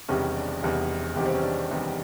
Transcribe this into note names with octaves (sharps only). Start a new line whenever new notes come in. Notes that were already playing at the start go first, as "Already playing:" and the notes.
E1 E2 C3 D#3 G3 C#4
D4
E1 E2 C3 D#3 G3
E1 E2 C3 D#3 G3 G4
C4
C#4
D4
E1 E2 C3 D#3 G3